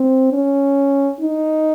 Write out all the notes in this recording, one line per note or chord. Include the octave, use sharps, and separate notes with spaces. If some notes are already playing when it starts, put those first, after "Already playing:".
Already playing: C4
C#4
D#4